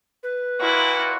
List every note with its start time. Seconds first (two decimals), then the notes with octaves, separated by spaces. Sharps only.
0.23 B4
0.60 A#2 E4 F#4